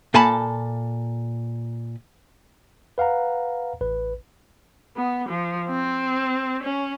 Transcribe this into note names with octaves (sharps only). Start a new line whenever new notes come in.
A#2 A4 G#5 A5 B5
B4 F5 F#5 A#5
A1 B4
B3
F3
C4
C#4